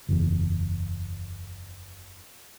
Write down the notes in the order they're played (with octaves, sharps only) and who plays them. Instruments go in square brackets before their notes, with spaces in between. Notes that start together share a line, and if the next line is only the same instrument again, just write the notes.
[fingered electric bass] F#1 E2